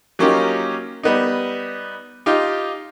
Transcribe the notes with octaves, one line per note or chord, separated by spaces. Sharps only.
F#3 A#3 C#4 D#4 F4 G4
G3 B3 D#4
D#4 F4 G4